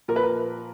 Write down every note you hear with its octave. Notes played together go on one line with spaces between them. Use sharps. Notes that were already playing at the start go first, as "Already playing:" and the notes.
A#2 F3 A#4
B4
A#4